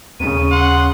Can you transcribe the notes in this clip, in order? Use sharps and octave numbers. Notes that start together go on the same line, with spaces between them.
D#2 C#3 D#7
F#5 C6